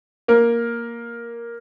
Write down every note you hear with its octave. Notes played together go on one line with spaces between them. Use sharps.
A#3 A#4